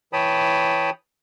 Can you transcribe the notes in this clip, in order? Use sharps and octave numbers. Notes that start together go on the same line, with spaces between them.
E3 C#5 G5 A5 B5 D#6